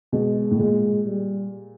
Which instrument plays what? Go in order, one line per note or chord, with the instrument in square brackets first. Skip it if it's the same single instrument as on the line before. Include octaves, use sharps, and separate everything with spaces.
[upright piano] B2 [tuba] G#3
[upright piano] A2
[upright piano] A#2 [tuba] G#3
[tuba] G3